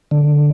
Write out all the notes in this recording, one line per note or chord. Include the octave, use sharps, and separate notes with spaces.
D3